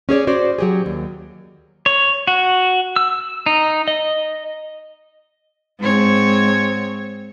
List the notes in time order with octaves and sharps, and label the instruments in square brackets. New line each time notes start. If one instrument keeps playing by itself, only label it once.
[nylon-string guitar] C#4 G#4 C#5 D5
F#4 C5 D5
F#3 G4 G#4
D#2
[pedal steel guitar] C#5
F#4
E6
D#4
D#5
[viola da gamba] G#2 C4 C#5